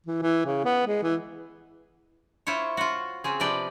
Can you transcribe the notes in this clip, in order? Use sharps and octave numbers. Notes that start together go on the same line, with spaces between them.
E3
E3
C#3
B3
G#3
E3
E4 F4 C5 C#5
F4 F#4
C#3 C4 G#4
C3 F3 B4 D5 G5